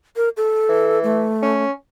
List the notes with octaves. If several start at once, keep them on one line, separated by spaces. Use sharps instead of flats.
A#4
A4
E3
A3
C#4